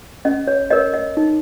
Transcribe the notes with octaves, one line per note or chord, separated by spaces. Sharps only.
C#4 D#5
C#5
A#4 C#5 D#5
D#5
D#4